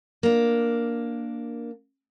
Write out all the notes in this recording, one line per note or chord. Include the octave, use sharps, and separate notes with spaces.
A#3 D4